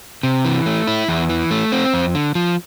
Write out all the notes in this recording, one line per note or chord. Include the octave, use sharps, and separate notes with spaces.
C3
E3
A3
E4
E2
E3
A3
C4
F2
D3
F3